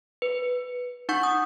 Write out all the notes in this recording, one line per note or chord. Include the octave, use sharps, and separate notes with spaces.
B4
D#4 F#5 C#6 G6
D#6